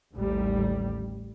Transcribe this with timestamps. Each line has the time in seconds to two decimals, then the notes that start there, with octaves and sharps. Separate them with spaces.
0.14 A1 D#2 G3